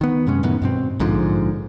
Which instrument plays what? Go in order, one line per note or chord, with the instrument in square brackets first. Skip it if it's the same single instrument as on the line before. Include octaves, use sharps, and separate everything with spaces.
[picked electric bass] D#3 B3
F#2 C3 G#3 C#4
F#2 A2 D#3 B3
G2 B2 C4
A#1 G#2 D3 F3